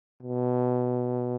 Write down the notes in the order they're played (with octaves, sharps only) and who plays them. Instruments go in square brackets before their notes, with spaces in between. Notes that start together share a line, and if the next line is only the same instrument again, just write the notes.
[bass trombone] B2